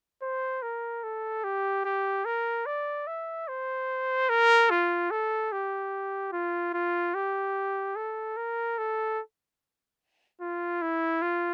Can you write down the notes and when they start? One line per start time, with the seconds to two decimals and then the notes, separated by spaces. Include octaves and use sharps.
0.23 C5
0.62 A#4
1.03 A4
1.44 G4
1.85 G4
2.25 A#4
2.66 D5
3.07 E5
3.48 C5
4.29 A#4
4.70 F4
5.11 A4
5.52 G4
6.33 F4
6.74 F4
7.15 G4
7.96 A4
8.37 A#4
8.78 A4
10.41 F4
10.82 E4
11.22 F4